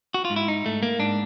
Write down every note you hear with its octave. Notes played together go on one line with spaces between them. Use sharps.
F#4
F4
G#2
E4
D#4
G#2 A3
A#3
G#2 D4